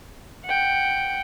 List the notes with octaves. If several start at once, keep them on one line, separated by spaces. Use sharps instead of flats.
F#5 G5